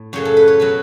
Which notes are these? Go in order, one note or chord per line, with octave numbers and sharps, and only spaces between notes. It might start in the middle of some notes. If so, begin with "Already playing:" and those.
Already playing: A2
F#2 C#3 F#3 C#5
A4
B4
C#5
B2 F#3 B4